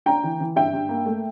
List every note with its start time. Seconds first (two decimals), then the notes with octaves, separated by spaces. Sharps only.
0.06 D4 G5 A#5
0.24 E3
0.40 E3
0.56 G2 E5 G5
0.74 G2
0.89 A#3
1.06 A3